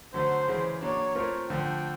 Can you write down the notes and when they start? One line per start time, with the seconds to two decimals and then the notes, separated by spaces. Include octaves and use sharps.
0.14 D3 F#3 A3 C5
0.48 C#3 E3 G#3
0.81 F#3 A#3 D4 C#5
1.15 A3 C4 F4 A#4
1.50 D3 F3 A3 G5